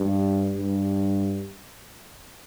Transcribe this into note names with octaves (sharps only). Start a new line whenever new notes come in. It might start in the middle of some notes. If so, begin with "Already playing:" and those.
Already playing: G2
G2